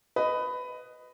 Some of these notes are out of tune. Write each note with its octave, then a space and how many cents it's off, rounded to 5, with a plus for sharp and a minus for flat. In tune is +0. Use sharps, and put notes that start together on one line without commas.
B4 +15 D#5 +0